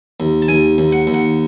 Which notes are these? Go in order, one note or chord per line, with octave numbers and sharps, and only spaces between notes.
D#2
A5
D#2 G#5
D#2
F#5
D#2
F#5